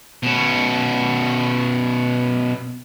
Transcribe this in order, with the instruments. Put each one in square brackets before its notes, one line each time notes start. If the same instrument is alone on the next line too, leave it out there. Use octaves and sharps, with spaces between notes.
[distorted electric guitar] B2 C#4